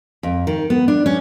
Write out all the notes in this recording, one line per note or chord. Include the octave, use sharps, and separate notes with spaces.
F2
D#3
B3
D4
C#4